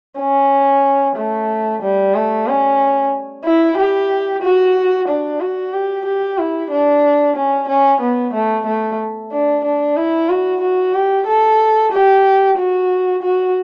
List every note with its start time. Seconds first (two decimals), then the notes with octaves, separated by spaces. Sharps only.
0.19 C#4
1.17 A3
1.82 G3
2.15 A3
2.47 C#4
3.45 E4
3.77 G4
4.42 F#4
5.08 D4
5.41 F#4
5.73 G4
6.05 G4
6.38 E4
6.71 D4
7.36 C#4
7.68 C#4
8.01 B3
8.34 A3
8.66 A3
9.32 D4
9.64 D4
9.96 E4
10.29 F#4
10.61 F#4
10.94 G4
11.27 A4
11.92 G4
12.57 F#4
13.22 F#4